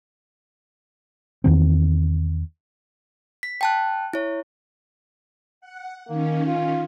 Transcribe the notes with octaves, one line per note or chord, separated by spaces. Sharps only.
E2 D#3 C4
B6
G5 A5 F#6
E4 C#5
F#5
D#3 A#3 C#4
F4